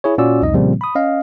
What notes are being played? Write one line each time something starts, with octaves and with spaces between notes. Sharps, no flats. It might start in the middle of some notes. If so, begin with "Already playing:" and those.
E4 G#4 C#5
A#2 C#4 F4 F#4 D5 E6
C2 F2 D#4 D#5
A#2 C#3 F3 G3 A#3 C4
B5 D#6
C#4 D#5 F5